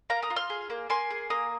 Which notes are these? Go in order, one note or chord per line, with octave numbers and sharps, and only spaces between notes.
A#3 F5 A#5
A#5 D#6
F4
C6 F6
G#4
A#3
A#3 G#5 C6
G#4
A#3 A#5 D#6